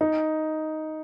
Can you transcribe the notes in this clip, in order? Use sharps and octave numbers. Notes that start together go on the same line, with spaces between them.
D#4